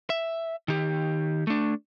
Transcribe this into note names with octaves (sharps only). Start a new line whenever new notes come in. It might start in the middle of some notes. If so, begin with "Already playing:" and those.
E5
D#3 G4
A3 D4